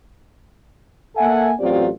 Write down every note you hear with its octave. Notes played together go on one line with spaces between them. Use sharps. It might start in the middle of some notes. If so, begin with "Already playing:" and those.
A#3 A4 E5 F#5 G#5
A1 F#3 C4 F4 G4 D5